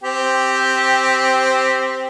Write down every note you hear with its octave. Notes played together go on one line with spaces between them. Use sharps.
C4 G4